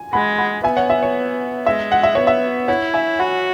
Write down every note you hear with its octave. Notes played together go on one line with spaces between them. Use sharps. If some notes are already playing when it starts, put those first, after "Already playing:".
Already playing: G#5
G#3 F#5 B5
F#5 B5
B3 E5 G#5
C#5 F#5
E5
C#5
G#3 E5
F#5
E5
B3 C#5
E5
E4 C#5 F#5
E5 G#5
F#4 F#5 B5